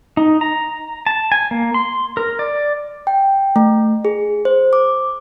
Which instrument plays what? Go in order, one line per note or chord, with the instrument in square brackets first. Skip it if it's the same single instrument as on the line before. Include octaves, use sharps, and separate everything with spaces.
[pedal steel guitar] D#4
A#5
A5
G#5
A#3
C6
A#4
D5
[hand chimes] G5
A3
G#4
C5
D6